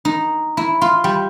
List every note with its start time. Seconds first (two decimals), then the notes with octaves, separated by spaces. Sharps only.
0.05 D#4
0.57 E4
0.81 F4
1.04 G3